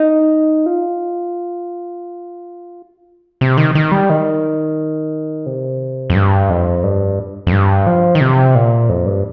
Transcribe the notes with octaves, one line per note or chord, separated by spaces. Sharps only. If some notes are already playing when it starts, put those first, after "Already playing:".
Already playing: D#4
F4
C3
D#3
D#3
G3
D#3
C3
F2
G2
F2
G2
F2
G2
F3
D#3
C3
A#2
F2
G2